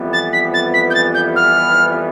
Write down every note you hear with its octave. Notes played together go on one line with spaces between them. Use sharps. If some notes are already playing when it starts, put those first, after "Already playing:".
Already playing: F2 E3 G3 B3
A6
B6
A6
B6
G6
A6
G6
F6